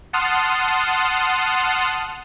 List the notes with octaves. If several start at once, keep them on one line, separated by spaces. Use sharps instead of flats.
F#5 A5 C6 D#6 F6